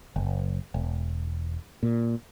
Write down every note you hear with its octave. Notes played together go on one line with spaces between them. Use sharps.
F#1
E1
A#2